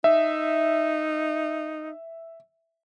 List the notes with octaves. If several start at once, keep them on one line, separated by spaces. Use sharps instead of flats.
D#4 E5